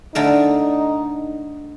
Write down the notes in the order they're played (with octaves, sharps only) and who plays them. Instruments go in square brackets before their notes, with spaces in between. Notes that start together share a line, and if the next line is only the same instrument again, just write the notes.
[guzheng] D3 A3 A#4 [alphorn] D#4